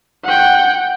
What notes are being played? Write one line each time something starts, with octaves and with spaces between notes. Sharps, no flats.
F#5 G5